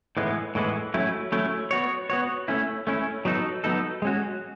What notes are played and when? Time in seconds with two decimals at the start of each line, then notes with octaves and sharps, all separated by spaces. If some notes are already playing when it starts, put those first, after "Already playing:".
0.17 A2 E3 G#3 B3
0.55 A2 E3 G#3 B3
0.94 F#3 A3 C#4 E4
1.32 F#3 A3 C#4 E4
1.71 B3 F#4 C#5
2.10 B3 F#4 C#5
2.48 A3 C#4 E4
2.87 A3 C#4 E4
3.25 F#3 B3 D#4 A4
3.64 F#3 B3 D#4 A4
4.02 G#3 C#4 F#4